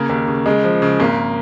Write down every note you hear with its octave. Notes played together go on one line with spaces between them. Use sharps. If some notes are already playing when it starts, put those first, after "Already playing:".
Already playing: C#3 A#3
D#2
C#3
C#3 G#3
F3
C#3
G#1 A#3